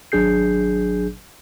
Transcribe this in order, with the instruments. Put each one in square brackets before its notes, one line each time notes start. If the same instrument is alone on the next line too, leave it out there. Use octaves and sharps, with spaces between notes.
[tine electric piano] G#1 F#3 D4 G#4 G6 C7